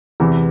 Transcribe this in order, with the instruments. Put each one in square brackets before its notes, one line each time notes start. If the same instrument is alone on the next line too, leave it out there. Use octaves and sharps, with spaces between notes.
[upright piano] E2 C3 E3